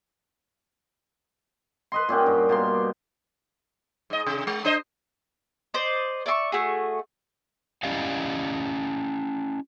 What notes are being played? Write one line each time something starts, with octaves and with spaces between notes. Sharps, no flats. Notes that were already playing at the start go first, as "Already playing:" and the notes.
B4 D#5 C6
A#2 C#4 G4 F#5
G2
B2 A#3 C6
G#2 D#5
C3
G#3
D4 C5 D#5
C5 D5 D#5 D6
D5 E5 C6 C#6
A3 F#4 G#4
C#4 E4 G4 D5 D#5 F5